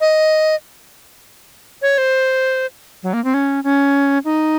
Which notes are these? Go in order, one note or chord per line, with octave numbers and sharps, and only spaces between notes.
D#5
C#5
C5
F#3
A#3
C4
C#4
C#4
D#4